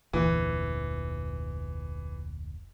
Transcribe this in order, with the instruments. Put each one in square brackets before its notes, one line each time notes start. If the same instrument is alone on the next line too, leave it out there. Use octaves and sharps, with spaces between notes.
[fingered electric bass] F1 D2 A#2 [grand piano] E3